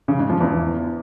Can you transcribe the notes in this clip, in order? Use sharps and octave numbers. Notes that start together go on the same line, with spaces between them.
C#3
G#2
F3
E2